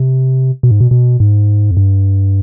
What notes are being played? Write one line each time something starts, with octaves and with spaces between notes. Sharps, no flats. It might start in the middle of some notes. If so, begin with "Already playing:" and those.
Already playing: C3
B2
G#2
B2
B2
G#2
F2
G2